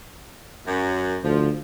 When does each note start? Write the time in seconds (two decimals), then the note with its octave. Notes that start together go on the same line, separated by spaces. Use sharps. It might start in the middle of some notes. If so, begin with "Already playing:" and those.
0.66 F#2
1.24 D2 F3